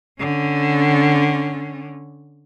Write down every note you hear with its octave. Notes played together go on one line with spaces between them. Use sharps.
D3 C#4